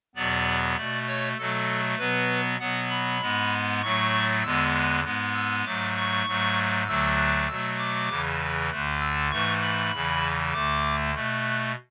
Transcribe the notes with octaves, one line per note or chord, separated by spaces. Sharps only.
E2 B2 F#3 B3 D5
B2 A3 D5
C#5
B2 F#3 A3 A4
B2 F#3 B3 B4
B2 F#3 B3 F#5
B5
G#2 G#3 B3
A2 F#3 A3 C#6
E2 D3 G#3 B3 E6
F#6
G#2 G#3 B3
E6
G#2 F#3 A3 D6
C#6
G#2 F#3 A3
D2 D3 F#3 A3 E6
F#6
B2 F#3 A3 E6
D6
E2 C#3 E3
F#6
D2 D3 A3
E6
G#2 E3 A3 C#6
B5
E2 C#3 E3
D2 D3 A3 D6
B2 A3 F#6